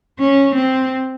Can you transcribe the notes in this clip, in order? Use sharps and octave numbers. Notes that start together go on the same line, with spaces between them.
C#4
C4